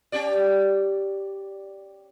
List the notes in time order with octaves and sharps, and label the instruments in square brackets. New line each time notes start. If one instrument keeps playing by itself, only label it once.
[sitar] C#4 G4 D5